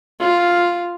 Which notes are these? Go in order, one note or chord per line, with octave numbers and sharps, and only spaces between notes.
F4